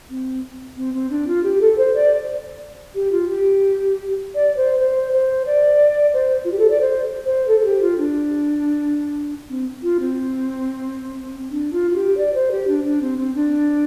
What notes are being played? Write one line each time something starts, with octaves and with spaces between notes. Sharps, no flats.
C4
C4
C4
D4
F4
G4
A4
C5
D5
G4
F4
G4
D5
C5
C5
C5
D5
C5
F4
G4
A4
D5
C5
C5
A4
A4
G4
F4
D4
C4
F4
C4
D4
F4
F4
G4
D5
C5
G4
D4
D4
C4
C4
D4